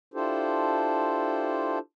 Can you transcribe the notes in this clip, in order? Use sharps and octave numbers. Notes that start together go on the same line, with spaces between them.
D4 E4 F4 G4 A4 C5